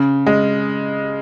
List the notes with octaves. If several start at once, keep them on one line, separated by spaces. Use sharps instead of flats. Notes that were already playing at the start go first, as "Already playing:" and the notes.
Already playing: C#3
G#3